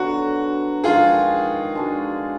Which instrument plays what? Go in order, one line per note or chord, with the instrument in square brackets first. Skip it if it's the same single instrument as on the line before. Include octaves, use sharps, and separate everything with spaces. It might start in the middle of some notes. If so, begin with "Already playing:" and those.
Already playing: [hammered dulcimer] D3 F#3 B3 D4 [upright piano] F#4
[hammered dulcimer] D#3 G#3 D4 [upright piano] F4 G#4
[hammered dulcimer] G#3 D4 F#4